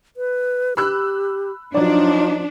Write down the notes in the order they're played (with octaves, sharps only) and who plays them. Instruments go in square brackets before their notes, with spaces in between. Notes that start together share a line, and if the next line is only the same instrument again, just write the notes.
[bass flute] B4
[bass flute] G4 [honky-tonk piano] B5 E6 F#6
[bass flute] F3 [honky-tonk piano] F#3 D5 [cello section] D4 [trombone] D#4